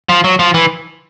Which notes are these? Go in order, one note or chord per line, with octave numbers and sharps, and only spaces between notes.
F3
F#3
F3
E3